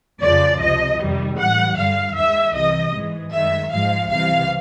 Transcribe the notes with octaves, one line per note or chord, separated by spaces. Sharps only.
F2 C#3 F3 D5
C#2 C3 F3 D#5
F2 C3 D#3 G3
A2 E3 G3 F#5
G2 D3 G3 F5
D#2 D#3 G#3 E5
C2 C3 E3 D#5
G#2 E3 G#3
F#2 D#3 G#3 E5
G#2 F3 G#3 F5
C#2 C3 E3 G3 F5